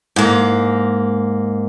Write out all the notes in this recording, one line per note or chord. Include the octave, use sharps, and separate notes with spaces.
G#2 A#3